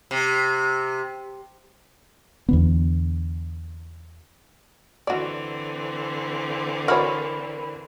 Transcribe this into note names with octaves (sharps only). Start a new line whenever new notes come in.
C3
E2 D3 B3
D3 E3 C4 F#4 D5
F#4 A#4 C#5 D5 B5 F6